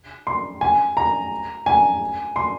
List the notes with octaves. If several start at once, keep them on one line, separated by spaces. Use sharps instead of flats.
C6
G#5
A#5
G#5
C6